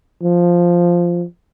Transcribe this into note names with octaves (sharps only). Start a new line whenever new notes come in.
F3